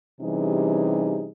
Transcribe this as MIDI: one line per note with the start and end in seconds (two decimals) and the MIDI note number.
0.21 1.29 48
0.21 1.29 52
0.21 1.29 55
0.21 1.29 61
0.21 1.29 63
0.21 1.29 68